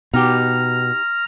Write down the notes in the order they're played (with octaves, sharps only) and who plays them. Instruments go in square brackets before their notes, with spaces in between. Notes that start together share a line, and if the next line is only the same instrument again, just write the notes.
[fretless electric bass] B2 [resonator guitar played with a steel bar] D#4 G4 [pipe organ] A#5 F6